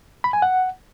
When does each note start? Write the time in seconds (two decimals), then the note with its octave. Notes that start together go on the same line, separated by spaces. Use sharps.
0.24 B5
0.33 G#5
0.42 F#5